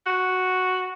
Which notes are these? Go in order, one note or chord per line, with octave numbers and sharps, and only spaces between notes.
F#4